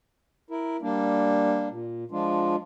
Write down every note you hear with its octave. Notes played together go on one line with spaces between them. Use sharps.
E4 A#4
G3 A#3 D4
A#2
F3 G#3 D4 F4